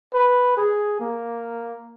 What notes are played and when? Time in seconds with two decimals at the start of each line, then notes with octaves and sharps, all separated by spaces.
0.14 B4
0.57 G#4
1.00 A#3